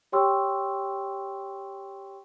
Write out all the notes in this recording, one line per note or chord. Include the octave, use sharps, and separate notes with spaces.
G4 C#5 G5 C6 C#6 E6